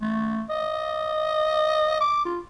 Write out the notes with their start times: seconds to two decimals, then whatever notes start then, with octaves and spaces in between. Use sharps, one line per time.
0.01 A3
0.50 D#5
2.01 D6
2.25 F4